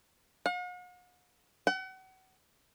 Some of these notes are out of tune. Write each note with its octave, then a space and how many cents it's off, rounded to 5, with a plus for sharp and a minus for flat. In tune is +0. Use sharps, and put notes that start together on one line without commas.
F#5 -45
F#5 +35